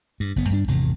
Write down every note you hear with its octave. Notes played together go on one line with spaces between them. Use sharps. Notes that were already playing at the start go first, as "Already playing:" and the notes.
G2
F#1 B3
G2 G3 D4
G#1 E2 C3 D#3